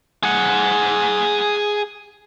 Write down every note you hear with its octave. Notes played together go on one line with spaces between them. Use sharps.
G#4 F#5